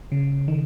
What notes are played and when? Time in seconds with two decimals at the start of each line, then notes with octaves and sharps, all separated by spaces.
0.12 C#3
0.48 D#3